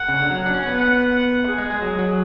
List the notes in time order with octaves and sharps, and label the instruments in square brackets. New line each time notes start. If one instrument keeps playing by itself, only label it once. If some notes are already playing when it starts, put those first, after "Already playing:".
Already playing: [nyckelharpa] F#5
[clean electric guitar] C#3
D3
F#3
[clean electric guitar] D4 [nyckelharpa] F#5
[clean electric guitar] C#4
B3
[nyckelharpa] F#5
G#4
[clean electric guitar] G#3
G#3
F#3
F#3